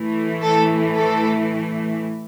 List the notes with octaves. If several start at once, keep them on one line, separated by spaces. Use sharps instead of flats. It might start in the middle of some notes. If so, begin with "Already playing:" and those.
Already playing: A2 E3 A3
A4
A4